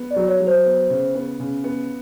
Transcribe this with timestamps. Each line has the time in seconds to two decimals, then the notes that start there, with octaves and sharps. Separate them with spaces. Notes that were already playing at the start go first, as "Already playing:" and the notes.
Already playing: B3
0.11 D5
0.16 F#3
0.28 C#5
0.40 F#3
0.47 C5
0.66 B3
0.90 C#3
1.15 B3
1.40 C#3
1.64 B3